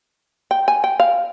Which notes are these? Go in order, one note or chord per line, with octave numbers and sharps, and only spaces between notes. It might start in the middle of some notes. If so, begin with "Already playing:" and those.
G5
G#5
G5
F5